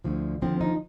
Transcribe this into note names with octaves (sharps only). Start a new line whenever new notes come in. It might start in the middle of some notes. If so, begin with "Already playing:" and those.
D2 D3 F3
D#2 D3 F3 C4
D#4